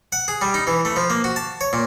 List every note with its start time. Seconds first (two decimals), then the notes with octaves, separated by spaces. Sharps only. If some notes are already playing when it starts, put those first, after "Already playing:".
0.12 F#5
0.28 G#4
0.42 G3
0.54 D#4
0.67 E3
0.85 A3
0.96 F3
1.10 A#3
1.24 F#4
1.36 A5
1.61 C#5
1.73 A#2